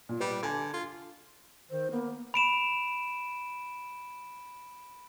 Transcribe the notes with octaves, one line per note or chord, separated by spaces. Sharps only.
A#2
G3 B4
D3 G#5 G#6
F4
D#3 C5
A#3 B3
B5 D7 E7